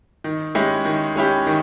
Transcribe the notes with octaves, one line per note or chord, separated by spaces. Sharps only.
D#3
G#3 C#4 E4 G4
D#3
G#3 C#4 E4 G4
D#3